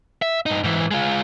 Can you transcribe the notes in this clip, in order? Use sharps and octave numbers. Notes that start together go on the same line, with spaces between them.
E5
G2 D#4
G#2 E3
G#3 F4